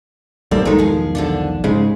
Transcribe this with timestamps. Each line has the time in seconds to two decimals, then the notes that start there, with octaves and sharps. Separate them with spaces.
0.51 B1 G3 A#3 C4 A4 A#4
0.65 E1 B1 D#3 G#3 D#4
0.78 F3 G#4
1.15 D3 F3 D4
1.64 G#2 C#3 G#3